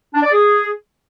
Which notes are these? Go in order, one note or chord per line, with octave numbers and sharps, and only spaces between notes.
D4
D5
G#4